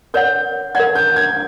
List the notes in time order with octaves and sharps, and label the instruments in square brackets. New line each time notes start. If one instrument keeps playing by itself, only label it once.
[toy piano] A#4 C#5 F#5 [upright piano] G6
[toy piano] A#4 C#5 F#5 [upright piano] G#6
[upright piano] G6
G#6